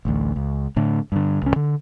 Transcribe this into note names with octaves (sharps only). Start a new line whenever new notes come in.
A1 D2
C#2
A2 D3
G2 D3
C#2 C#4
D3